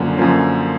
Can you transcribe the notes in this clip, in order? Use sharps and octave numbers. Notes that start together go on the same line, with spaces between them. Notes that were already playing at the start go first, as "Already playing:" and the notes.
Already playing: F#2 D3 F3 A#3 C#4
F#2 D3 F3 A#3 C#4